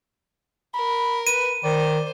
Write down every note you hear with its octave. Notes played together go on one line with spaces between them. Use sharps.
A#4 B5
B4 D#7
D#3 C5 D5